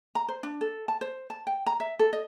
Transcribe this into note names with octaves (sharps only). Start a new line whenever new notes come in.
A#5
C5
D4
A4
A5
C5
A5
G5
A#5
E5
A4
D#5